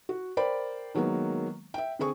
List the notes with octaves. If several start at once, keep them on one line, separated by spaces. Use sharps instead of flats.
F#4
A#4 C5 D5 G5 B5
D#3 F#3 G#3 A#3 B3
E5 G5
D3 C4 G#4 C#6